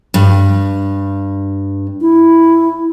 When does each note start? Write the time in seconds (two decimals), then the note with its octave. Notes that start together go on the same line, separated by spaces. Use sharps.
0.14 G2
2.01 E4